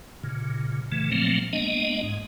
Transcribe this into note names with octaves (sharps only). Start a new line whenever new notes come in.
A#2 C#3
A#2 C#3 E3 A3
A#2 F3 F#3 A3 A#3 C4
G#3 A#3 B3 D4 D#5
G#2